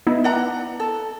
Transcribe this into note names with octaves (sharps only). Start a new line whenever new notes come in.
B3 D#4 E4
D5 F#5 A#5
A4